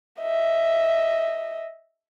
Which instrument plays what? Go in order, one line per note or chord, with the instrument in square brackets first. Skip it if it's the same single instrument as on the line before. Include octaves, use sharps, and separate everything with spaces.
[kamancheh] D#5 E5